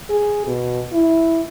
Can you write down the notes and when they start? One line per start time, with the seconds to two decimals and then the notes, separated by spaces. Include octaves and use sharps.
0.10 G#4
0.47 B2
0.93 E4